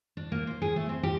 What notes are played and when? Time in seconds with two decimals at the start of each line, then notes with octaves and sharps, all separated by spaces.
0.17 D4
0.32 A#3
0.47 C5
0.62 G#4
0.76 A3
0.89 C4
1.03 G4